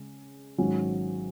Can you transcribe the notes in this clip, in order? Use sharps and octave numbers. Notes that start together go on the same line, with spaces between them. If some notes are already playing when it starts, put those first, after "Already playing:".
Already playing: C#3 G#3 C#4
G#1 G#2 F#3 C#4